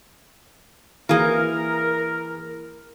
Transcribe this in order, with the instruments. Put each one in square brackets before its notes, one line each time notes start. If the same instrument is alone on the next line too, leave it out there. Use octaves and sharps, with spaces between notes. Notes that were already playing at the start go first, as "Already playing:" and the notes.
[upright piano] E3 [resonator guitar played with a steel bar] A#3 G#4 [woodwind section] A#4